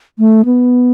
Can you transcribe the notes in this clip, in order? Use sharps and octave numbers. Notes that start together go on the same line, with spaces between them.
A3
B3